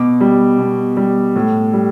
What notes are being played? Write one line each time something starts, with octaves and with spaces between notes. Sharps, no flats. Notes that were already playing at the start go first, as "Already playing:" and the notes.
Already playing: B2 D6
G3
B2
G3
A2
G3